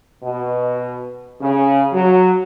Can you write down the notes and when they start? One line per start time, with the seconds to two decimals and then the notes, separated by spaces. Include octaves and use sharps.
0.23 B2
1.41 C#3
1.93 F#3